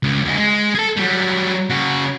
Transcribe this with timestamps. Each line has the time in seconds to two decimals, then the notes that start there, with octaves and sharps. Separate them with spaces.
0.03 C#2
0.25 D2 G#3
0.37 G#3
0.75 G#4 A4
0.97 F#3 G3
1.70 C#3 F#4